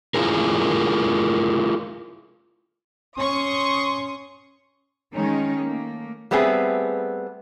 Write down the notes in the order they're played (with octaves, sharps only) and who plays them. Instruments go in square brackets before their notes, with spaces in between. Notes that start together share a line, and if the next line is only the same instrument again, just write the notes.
[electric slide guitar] E4 F4 G#4 A#4
[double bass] C#4 [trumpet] C6 [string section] C#6 D#6
[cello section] D#3 G#3 C#4 D#4
A3 A#3
[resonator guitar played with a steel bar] G3 A3 B3 C4 G#4